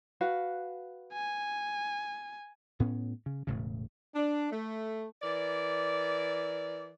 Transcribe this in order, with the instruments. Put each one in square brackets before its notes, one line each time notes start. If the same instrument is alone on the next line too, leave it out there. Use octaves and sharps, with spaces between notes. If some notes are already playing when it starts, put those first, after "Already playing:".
[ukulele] F#4 B4 F5
[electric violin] G#5
[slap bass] A2 B3 C#4
C#3
E1 A2 C#3
[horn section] D4
A3
[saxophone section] E3 A#4 D5